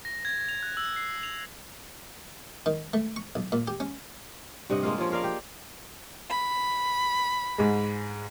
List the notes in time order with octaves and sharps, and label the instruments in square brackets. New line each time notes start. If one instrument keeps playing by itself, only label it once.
[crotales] A#6
G#6
F7
F#6
E6
C7
F7
[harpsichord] D#3
A3
C#6
B1
A#2
G4
C#4
[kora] G2 C3 D#5 F#5
G#3 A#3 F4
F3 C#4 F4
F4 A#4 D5 F5
G4
[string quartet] B5
[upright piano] G#2 G#3